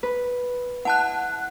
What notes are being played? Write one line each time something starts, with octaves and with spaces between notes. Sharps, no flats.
B4
E4 F#5 A5 F#6